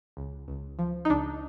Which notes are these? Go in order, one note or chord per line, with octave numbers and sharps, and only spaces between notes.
C#2
C#2
F3
D#4
C#2 D4